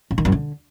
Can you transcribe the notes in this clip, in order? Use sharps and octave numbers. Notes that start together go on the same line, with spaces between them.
C#3
D#3
F#2
D3